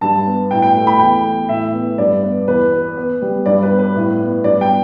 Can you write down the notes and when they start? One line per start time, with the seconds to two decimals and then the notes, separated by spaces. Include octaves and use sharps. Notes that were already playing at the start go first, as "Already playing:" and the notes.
0.01 G2 A5
0.26 B3
0.51 A2 G5
0.62 G5
0.75 A3
0.87 B5
0.99 E2 G5
1.24 A3
1.48 A2 E5
1.73 B3
1.98 G2 D5
2.23 B3
2.47 E2 B4
2.72 B3
2.97 B3
3.22 G3
3.46 G2 D5
3.63 B4
3.71 B3
3.79 B4
3.96 A2
4.19 B3
4.44 G2 D5
4.61 G5
4.69 B3